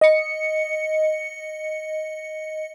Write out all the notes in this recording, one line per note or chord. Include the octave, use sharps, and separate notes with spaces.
D#5 C#7